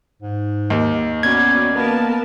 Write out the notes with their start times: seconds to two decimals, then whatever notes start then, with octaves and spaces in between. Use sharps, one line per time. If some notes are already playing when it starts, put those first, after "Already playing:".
0.22 G#2
0.70 D#2
1.23 B3 C#4 F#4 D5 G#6
1.76 A#3 B3 A#4 A5